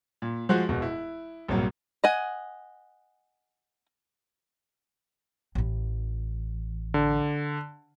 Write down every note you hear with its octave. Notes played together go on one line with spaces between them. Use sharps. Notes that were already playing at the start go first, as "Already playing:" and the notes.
A#2
F3 G#3 F#4 C5 F#6
E1 B2
E4
A#1 G2 C3 F#3 A#3
D#5 F#5 G#5
A1 E3
D3